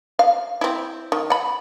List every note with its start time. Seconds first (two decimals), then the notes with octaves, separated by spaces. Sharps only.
0.19 F5
0.61 C4 E4
1.12 D#3
1.30 F#5 B5